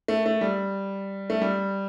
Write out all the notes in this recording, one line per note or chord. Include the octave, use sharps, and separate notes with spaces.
A3
A3
G3
A3
G3